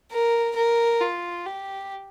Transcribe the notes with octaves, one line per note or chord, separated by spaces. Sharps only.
A#4
A#4
F4
G4